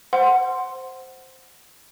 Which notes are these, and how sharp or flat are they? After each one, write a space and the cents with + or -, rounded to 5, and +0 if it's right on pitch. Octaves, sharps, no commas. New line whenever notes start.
C5 +0 F#5 +0 C6 +0